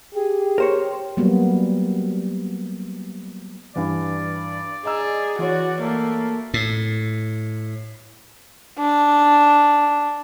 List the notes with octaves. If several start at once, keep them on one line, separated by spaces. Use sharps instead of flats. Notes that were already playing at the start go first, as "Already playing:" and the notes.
G4 G#4
A#4 C5 C#5
F#3 G3 A#3 B3
G2 E3 D5
G#4 D#5 A#5 E6
E3 F#4 C#5
A3 A#3
A2
D4